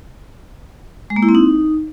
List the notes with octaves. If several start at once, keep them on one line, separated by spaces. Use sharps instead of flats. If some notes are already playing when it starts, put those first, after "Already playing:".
G#3
A#3
E4
C4
D#4